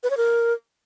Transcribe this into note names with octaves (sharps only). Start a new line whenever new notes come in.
B4
C#5
A#4